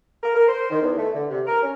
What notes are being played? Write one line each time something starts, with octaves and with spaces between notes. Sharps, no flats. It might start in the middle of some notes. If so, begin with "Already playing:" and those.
A#4
A#4
C5
D#3
E2
A3
D3
C3
A#4
C#4